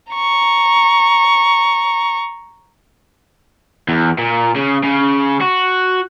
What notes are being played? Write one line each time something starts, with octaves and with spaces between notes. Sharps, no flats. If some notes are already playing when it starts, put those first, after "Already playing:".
A#5 C#6
E2
A#2
C#3
C#3
F#4